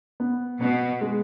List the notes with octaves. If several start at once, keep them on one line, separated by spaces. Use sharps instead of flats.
B3
B2 B3
G#3